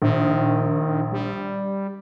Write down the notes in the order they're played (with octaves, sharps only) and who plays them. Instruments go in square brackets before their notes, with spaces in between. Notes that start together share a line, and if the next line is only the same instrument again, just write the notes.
[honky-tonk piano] A#1 [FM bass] D#3
[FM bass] G3